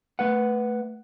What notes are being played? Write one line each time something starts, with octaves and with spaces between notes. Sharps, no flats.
A3 B4 F#5